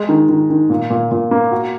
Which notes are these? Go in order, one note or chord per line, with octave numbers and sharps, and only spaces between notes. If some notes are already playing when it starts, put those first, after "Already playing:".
Already playing: G#3
D#3
D#3
D#3
A#2
A#2
A#2
A#3
F#4